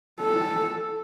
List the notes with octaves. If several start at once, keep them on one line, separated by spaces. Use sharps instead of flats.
A4